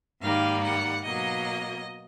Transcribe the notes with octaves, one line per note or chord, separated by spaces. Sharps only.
G#2 D#3 G3 A#3 F5
F#5
B2 F#3 A#3 D#5